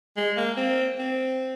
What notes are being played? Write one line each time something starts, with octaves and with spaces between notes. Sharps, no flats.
G#3
A#3
C4
C4